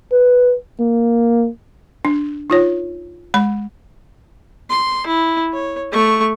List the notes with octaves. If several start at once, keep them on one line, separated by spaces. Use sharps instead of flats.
B4
A#3
D4
D#4 F4 C#5
G#3 B5
C6
E4
C#5
A3 C#6